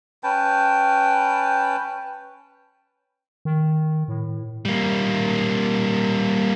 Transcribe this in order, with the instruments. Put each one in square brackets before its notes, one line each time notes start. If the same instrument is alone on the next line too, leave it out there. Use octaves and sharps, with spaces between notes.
[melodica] C#4 B4 G5 A5
[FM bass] D#3
A2
[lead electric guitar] G3 A#3